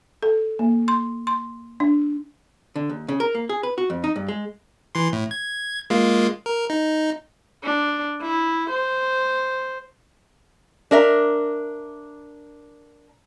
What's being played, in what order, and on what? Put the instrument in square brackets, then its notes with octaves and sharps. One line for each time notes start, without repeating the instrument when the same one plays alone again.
[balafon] A4
A#3
C6
C6
D4
[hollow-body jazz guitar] D3
D#2
C#3
A#4
A#3
G#4
B4
F#4
F2
D#4
G2
G#3
[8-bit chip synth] E3 C6
A2
G#6
G#3 A#3 F4
A#4
D#4
[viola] D4
E4
C5
[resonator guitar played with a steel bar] D4 A#4 E5